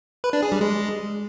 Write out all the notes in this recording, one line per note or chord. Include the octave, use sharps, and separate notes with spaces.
B4
D4
G#4
G3
G#3